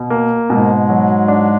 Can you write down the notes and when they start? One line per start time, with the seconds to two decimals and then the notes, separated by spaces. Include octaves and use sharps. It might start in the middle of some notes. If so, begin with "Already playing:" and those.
Already playing: B2
0.10 A#3
0.50 G#2 B2 G#3
0.89 F#3
1.28 D4